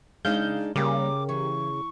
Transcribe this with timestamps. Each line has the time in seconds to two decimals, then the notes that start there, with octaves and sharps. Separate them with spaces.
0.25 C#3 G#3 D4 D#4 F5 G6
0.76 C#3 G3 A#3 G4 A#4 D6
1.29 E3 C#6